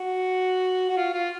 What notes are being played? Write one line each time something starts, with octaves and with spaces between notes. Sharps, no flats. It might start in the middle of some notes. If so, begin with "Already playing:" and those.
Already playing: F#4
F#4
F4
F4